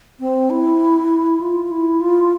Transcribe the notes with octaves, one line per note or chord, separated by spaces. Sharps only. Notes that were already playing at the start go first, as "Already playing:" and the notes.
C4
E4
F4
E4
F4